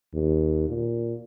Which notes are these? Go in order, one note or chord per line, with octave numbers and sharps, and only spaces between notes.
D#2
A#2